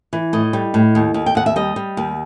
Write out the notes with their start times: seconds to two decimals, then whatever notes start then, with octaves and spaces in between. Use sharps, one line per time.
0.13 E3
0.33 A2 D#5
0.53 G3
0.74 A2
0.95 D#2
1.14 D#2
1.26 G5
1.35 D#2 F#5
1.46 E5
1.56 G3 D#5
1.76 G3
1.97 D#2